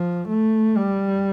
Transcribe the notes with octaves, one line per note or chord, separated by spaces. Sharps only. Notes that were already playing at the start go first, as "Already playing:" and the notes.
Already playing: F3
A3
G3